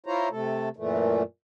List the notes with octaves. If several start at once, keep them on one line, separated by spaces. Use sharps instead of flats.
E4 F4 C5 C#5 A#5
C3 A3 A4
F#2 A#2 E3 A3